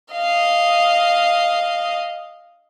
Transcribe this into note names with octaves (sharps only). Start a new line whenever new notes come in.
D#5 F5